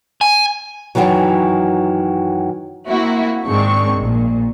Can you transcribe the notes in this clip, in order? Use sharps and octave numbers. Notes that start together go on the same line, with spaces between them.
G#5
F#2 B2 D#3 E3 F#3
A#3 C4 E4 F#4
G#2 D#3 G#3 C4 D4 C#6
A#1 A#2